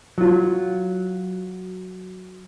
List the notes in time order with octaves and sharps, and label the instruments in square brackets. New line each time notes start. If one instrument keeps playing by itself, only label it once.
[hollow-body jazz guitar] F#3 F4